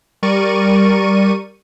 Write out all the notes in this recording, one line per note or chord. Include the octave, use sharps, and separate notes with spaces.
G3 A#4 D5 C#6 D#7